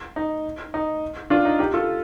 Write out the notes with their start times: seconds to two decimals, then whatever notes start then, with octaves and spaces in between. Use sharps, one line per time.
0.16 D#4
0.74 D#4
1.30 D4 F4
1.45 D#4
1.59 D#4 G4
1.74 F4 A4